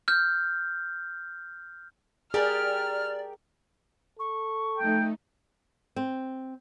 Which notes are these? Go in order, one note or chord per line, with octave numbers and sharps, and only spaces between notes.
F6 G6
G4 G#4 A#4 D5 F6
A4 C#6
F3 A3 D#4 G5
C4